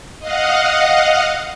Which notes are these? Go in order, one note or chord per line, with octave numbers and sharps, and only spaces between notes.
D#5 F5 F#5